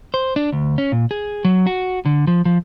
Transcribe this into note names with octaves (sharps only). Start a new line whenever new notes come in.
C5
D4
D2
C#4
A#2
G#4
F#3
F#4
D3
F3
F3